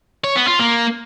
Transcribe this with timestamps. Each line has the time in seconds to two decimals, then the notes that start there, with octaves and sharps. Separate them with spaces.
0.24 C#5
0.36 B3
0.48 F4
0.60 A#3